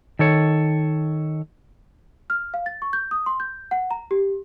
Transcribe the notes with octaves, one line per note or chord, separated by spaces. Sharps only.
D#3 A4 C#5
F6
F5
A6
C#6
G6
D#6
C6
G6
F#5
A#5
G4